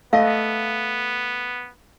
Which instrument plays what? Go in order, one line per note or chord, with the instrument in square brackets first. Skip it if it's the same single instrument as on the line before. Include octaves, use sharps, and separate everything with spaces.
[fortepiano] A3 D#5 [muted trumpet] B3 [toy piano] F5